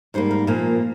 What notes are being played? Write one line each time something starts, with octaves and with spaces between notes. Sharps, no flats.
G#2 G3 A#3 C5
A#4
A#2 F3 A#3